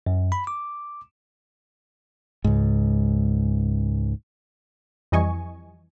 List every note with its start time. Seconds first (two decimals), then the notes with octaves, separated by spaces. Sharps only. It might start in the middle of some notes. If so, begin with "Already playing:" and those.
0.06 F#2
0.32 B5
0.47 D6
2.44 C#2 G#2
5.12 F2 E3 G3 D#5 G#5 C#6